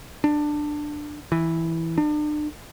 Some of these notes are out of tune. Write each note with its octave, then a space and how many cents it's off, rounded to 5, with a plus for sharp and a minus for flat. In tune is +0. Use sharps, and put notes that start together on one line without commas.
D4 +15
E3 -5
D4 +40